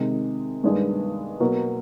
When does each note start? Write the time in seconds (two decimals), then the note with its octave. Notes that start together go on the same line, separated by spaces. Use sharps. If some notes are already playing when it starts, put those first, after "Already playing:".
Already playing: C3 D#3 G#3
0.64 G2 D#3 G#3 B3 D4
1.40 B2 F#3 A#3